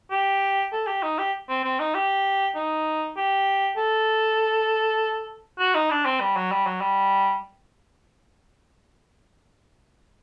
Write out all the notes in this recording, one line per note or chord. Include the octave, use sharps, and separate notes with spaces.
G4
A4
G4
D#4
G4
C4
C4
D#4
G4
D#4
G4
A4
F#4
D#4
D4
C4
G3
F#3
G3
F#3
G3